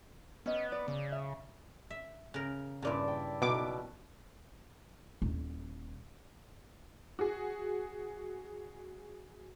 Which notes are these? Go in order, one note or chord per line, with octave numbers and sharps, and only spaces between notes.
B3 C#4 D#5
D5
C#3
E5
E5
C#3 A#4
G2 A#2 C#3 E4 D5 A5
G5
B1 B2 F#3 E4 D6
D#1 E4
F#4 G#4